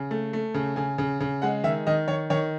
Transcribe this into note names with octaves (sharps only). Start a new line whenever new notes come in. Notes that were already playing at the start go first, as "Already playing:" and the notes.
Already playing: C#3
A3
A3
C#3
C#3 G#5
C#3
C#3
G#3 F#5
D#3 E5
D#3 D#5
D#3 C#5
D#3 C#5